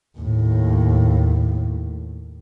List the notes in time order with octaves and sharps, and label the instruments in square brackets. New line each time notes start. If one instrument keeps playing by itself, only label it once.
[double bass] D#2 A2